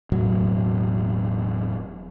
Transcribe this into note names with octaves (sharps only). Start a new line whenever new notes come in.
E1 A2 F#3